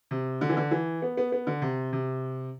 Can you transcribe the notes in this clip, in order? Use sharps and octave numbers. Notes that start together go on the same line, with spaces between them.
C3
D3
E3
D3
E3
B3
B3
B3
D3
C3
C3